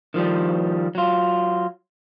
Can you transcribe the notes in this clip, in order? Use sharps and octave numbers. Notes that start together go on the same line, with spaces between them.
D#3 F3 G3
F#3 F4